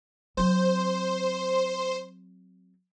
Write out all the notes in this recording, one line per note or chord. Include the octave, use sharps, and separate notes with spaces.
F#3 C4 C5